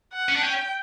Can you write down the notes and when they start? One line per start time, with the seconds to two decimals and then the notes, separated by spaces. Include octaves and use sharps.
0.13 F#5
0.29 C#4
0.36 D4
0.43 C#4 G5